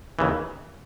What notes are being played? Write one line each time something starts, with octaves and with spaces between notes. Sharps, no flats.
D#2 C#3 E3